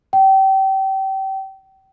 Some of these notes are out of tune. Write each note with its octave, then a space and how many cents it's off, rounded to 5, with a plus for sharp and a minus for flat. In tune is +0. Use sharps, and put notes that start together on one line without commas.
G5 -30